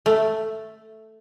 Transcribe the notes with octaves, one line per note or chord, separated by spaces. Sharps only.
A3